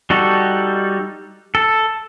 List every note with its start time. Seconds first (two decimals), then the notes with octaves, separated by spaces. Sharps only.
0.10 G3 D#4 F#4 A4
1.55 A4